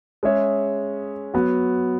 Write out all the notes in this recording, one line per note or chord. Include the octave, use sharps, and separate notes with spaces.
G#3 C#4 G#4 C#5 E5
F#3 B3 F#4